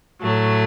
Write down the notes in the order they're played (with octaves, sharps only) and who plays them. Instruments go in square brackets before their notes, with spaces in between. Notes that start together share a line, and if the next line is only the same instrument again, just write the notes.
[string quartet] A2 F#3 A3